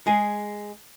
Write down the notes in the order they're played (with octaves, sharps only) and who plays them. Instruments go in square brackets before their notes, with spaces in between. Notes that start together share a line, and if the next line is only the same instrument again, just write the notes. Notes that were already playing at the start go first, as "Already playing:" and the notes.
[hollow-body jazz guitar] G#3 G#4